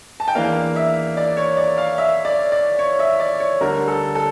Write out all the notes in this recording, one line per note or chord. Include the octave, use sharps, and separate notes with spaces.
A5
G5
E2 E3 A#3 D4 F5
E5
D5
C#5
D5
F5
E5
D5
D5
C#5
E5
D5
C#5
D2 D3 G3 A#4
A4
A4